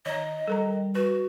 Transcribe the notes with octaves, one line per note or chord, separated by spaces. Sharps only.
D#3 C#5 D#5 A#5
G3 A4 A#4 A#5
F#4 B4